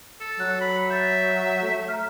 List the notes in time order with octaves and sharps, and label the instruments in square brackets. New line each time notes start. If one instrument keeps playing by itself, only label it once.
[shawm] A4
[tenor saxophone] F#3 [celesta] F#6
[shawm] B5
[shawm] E5 [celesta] G6 A6
[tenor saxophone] A3
[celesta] A#5 F6